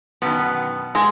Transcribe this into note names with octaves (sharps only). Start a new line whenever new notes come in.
F#2 B2 D#3 B3
G#3 G#4